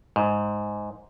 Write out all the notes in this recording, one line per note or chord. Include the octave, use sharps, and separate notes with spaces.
G#2